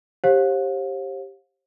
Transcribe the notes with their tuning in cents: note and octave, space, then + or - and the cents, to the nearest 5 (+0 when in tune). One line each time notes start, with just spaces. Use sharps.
G4 +0 C5 +40 F5 +35